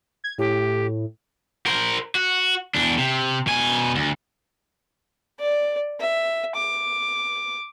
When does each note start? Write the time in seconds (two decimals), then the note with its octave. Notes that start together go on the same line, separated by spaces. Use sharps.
0.24 G#6
0.38 A2 G4
1.66 A#4 C5
2.15 F#4
2.74 E2 D4
2.98 C3
3.47 B2 G#5
3.95 D2
5.40 D5
6.01 E5
6.56 D6